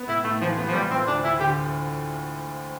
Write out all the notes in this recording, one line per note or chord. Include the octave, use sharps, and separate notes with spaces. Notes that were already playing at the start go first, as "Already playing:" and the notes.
Already playing: B3
A2 E4
A2 A3
E3 F3
B3
F3
A2 G3
F3 C4
D2 D4
D2 E4
D3 G4